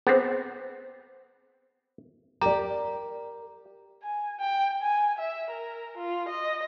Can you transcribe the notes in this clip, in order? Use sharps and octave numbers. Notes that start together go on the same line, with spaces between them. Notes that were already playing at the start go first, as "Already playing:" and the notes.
B3 C4 G#4 C5
G4 A#4 D5 A#5
G#5
G5
G#5
E5
A#4
F4
D#5